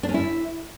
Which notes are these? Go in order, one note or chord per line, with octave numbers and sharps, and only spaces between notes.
D4
C#4
E4